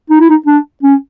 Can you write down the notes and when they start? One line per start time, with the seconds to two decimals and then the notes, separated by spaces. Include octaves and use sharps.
0.10 D#4
0.20 E4
0.30 D#4
0.47 D4
0.83 C#4